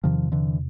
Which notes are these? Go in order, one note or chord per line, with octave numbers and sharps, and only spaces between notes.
E2 C3 D#3 F3
D3 E3